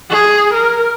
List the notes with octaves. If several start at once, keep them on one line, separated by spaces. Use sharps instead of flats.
G#4
A#4